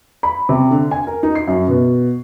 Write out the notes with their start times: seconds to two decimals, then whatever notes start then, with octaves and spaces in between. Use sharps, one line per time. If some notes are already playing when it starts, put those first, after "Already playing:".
0.23 B5
0.49 C3
0.71 D3
0.91 G#5
1.07 A#4
1.23 D#4
1.35 C7
1.47 F#2
1.68 B2